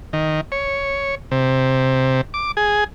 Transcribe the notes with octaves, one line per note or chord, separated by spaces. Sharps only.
D#3
C#5
C3
D6
G#4